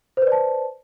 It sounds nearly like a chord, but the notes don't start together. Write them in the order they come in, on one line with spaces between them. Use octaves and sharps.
C5 B4 D5 A5